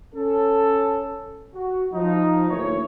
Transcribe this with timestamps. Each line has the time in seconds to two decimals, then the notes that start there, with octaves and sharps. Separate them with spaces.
0.14 C#4 A4
1.54 F#4
1.93 F3 D#4
2.50 D2 G#2 E3 A#3 C#5